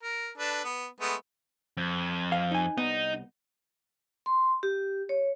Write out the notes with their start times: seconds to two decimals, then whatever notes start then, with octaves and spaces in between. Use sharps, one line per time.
0.03 A#4
0.38 D4 A4 B4
0.64 B3
1.00 G#3 A3 B3
1.77 F2
2.32 F5
2.51 D#4 G#5
2.78 C2 B3 D#4
4.26 C6
4.63 G4
5.09 C#5